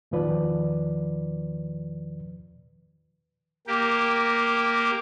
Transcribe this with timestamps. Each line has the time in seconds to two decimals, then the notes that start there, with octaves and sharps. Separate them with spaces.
0.11 E2 A#2 D#3 F3 B4 D5
3.67 A#3 G4